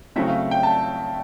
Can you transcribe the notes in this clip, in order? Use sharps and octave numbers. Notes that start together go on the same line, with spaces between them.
C#3 F#3 A3 C4 E4 E5
F5
G5
A5